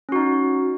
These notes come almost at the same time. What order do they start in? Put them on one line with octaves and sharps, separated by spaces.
C#4 F#4 D#4